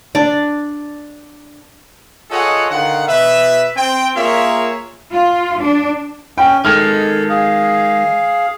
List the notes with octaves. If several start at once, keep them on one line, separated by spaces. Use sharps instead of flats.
D4 D5
F4 G#4 A4 C#5 D#5 F#5
D3 D#3 F5 F#5
B2 B4 E5
C4 G5
A#3 F4 G#4 A#4 C#5 E5
F4
D4
C#4 G5
D#3 G#3 A4 F6
G#4 F5